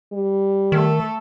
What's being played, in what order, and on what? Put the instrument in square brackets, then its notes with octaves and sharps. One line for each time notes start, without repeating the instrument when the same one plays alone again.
[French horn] G3
[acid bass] D#3 [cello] A3 A4